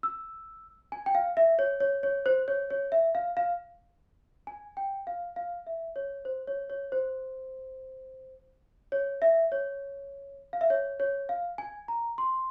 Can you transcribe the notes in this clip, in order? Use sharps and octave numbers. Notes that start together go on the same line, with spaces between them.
E6
G#5
G5
F5
E5
C#5
C#5
C#5
C5
C#5
C#5
E5
F5
F5
G#5
G5
F5
F5
E5
C#5
C5
C#5
C#5
C5
C#5
E5
C#5
F5
E5
C#5
C#5
F5
G#5
A#5
C6